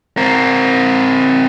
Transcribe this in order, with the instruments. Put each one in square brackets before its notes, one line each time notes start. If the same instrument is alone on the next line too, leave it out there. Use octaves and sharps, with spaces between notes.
[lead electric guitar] C4 A#4